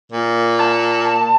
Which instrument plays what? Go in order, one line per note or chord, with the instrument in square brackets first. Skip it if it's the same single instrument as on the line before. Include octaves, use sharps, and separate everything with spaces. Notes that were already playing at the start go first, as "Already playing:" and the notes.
[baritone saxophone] A#2
[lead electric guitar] A5